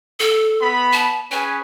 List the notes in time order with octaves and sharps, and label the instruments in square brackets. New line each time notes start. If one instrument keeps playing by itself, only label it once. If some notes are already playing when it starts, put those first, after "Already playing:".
[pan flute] A4
[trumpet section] B3 B5
[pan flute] A5
[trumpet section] C#4 G#4 B4 [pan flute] G#5